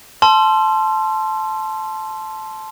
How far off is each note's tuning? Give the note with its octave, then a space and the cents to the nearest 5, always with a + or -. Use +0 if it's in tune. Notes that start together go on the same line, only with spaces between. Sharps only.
A5 -15 C6 +0 E6 +45